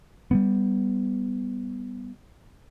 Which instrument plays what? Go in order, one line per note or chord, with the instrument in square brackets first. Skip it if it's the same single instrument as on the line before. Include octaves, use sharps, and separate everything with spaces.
[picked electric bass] G3 A#3 B3